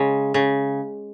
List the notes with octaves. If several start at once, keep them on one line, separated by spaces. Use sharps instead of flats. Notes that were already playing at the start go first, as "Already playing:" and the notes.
Already playing: C#3 G#3
C#3